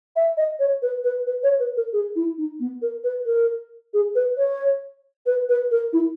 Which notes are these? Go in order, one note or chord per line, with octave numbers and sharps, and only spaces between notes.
E5
D#5
C#5
B4
B4
B4
C#5
B4
A#4
G#4
E4
D#4
B3
A#4
B4
A#4
G#4
B4
C#5
B4
B4
A#4
E4